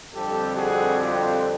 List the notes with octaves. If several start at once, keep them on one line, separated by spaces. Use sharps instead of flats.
F2 D3 G3 C4 G4 A4
F#4 G#4
F4 G4